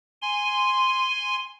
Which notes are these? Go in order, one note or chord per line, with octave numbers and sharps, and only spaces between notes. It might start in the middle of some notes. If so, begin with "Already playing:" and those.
G#5 C6